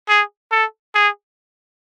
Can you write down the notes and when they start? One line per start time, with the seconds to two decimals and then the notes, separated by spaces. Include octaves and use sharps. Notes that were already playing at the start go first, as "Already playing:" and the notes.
0.09 G#4
0.51 A4
0.95 G#4